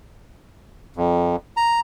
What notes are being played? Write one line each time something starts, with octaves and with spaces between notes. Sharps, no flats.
F2
A#5